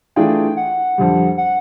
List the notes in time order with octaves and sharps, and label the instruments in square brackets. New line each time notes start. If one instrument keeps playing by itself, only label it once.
[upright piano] E3 A3 D4 F4 G#4 [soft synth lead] G5
[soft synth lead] F#5
[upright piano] F2 D3 G3
[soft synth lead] F#5